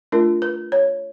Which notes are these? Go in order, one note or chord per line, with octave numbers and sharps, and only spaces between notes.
A3 D4 F4 A#4
B4
C#5